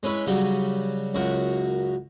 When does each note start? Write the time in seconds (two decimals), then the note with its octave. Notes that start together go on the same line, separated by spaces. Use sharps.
0.03 G#3 C#4 E4 B4 C#5
0.26 C#3 F#3 G3 D#4 F#4
1.14 C#2 F#2 F#4 A#4 C#6